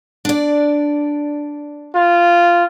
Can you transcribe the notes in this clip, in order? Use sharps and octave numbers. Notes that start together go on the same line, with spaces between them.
D4 D5
F4